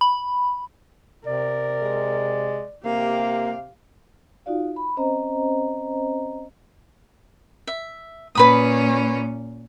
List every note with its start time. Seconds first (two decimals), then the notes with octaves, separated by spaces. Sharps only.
0.01 B5
1.27 C3 A#4 D5
1.82 G#3
2.85 C3 A#3 G4 F5
4.46 D#4 F4 F#4 D5 F5
4.76 B5
4.97 C4 C#4 C5 D#5 A#5
7.67 E5
8.35 A#2 C#4 B4 B5 D#6